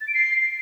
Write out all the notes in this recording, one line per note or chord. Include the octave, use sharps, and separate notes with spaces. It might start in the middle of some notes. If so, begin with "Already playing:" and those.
A6
D7
C7